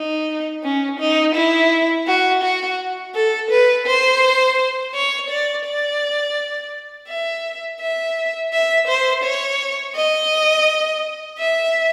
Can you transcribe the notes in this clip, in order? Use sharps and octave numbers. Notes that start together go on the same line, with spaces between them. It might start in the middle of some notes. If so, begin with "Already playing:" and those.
Already playing: D#4
C#4
D#4
E4
F#4
F#4
A4
B4
C5
C#5
D5
D5
E5
E5
E5
C5
C#5
D#5
E5